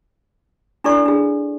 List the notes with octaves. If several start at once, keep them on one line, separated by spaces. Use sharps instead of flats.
D4 E4 A4 D5 C#6
D4 G#4